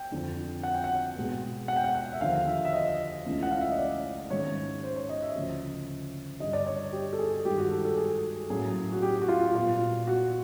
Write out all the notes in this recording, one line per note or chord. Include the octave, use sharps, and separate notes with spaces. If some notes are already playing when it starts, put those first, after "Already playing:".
Already playing: G5
F2 D3 F3
F#5
G5
F#5
B2 G#3 B3
F#5
G5
F#5
F#5
E5
D#2 D3 F3 F5
E5
E5
D#5
C#2 C#3 E3 A3 C#4
F#5
F5
E5
D#5
D5
G#2 D#3 G#3 C#4 C#5
C5
C#5
D#5
E5
D2 C#3 F3
G2 D3 G3 D#5
D5
C#5
G4
A4
G#4
G2 D#3 G#3 G4
F#4
A4
A4
G#4
A2 F#3 A#3 C#4 G#4
F#4
G4
F#4
F4
A#2 G3 B3 F4
F#4